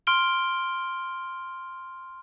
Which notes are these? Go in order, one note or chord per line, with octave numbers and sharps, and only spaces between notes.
C6 F6 D7 G7